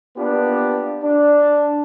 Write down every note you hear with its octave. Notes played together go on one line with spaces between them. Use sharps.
A#3 B3 D4 F4 G4 B4
D4